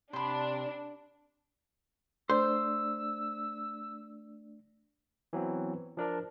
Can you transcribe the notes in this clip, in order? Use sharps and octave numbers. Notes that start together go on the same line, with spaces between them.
C3 D4 B5 C6
A3 D4 C5 D5 E6
E3 F#3 B3 C4
F3 D4 A#4 D5